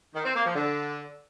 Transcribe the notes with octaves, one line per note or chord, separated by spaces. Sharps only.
D#3
C4
A#3
F3
D3